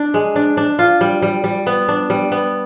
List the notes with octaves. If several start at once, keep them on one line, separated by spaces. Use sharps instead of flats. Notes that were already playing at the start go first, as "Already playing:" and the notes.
Already playing: D4
G#3
D4
D4
F4
G3
G3
G3
B3
D4
G3
B3